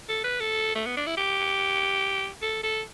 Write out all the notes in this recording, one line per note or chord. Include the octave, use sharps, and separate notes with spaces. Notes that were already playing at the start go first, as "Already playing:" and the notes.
A4
B4
A4
A3
B3
D4
E4
G4
A4
A4